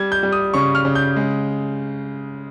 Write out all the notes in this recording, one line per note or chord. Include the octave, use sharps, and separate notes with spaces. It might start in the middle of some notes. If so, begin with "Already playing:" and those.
Already playing: G3 G#6
G6
G3
D#6
C#3 C#6
F6
C#3
G6
G#3